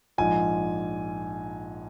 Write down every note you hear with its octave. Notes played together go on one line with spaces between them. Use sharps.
A#1 G#2 F3 G#5